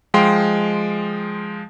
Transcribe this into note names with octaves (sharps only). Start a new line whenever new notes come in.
F3 G#3 F5 G5 C6